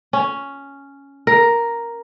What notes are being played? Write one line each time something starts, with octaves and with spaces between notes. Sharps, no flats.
C#4
A#4